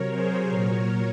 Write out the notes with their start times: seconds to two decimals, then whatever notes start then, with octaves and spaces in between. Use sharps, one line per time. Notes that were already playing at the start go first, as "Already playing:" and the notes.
Already playing: C3 F#3 A#4 C#5
0.11 G#4 C5
0.48 A#2 F#3 A#4 C#5